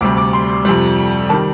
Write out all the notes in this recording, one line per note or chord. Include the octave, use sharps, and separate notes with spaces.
D2 C3 G3 D6
D6
C6
F2 C3 G3
D#3 G3 A5